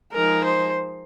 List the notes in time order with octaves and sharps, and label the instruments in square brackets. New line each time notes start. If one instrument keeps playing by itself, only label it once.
[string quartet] F3 G#3 D#4 G#4 [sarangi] A#4
[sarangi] C5